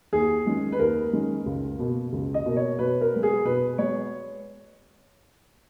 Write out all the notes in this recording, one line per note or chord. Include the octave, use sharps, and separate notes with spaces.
D#2 G#4
D#3 G#3 C#4
B4
D#2 A#4
D#3 G#3 C#4
C#2
B2 A#3
C#2
D#5
B2 A#3
C#5
B2 B4
A#4
G#3 B3
G#4
B2 B4
G#3 B3 C#5